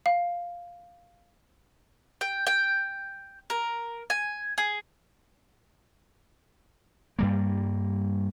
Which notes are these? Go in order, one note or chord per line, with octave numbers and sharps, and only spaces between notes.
F5
G5
G5
A#4
G#5
G#4
G2 G3 A#3